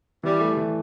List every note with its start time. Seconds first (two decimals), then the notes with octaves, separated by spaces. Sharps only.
0.23 E3 G3
0.41 A3
0.57 E3